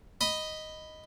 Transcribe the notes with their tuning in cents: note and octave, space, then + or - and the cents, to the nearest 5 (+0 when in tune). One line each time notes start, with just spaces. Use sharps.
D#5 +0 B5 +0 D#6 +0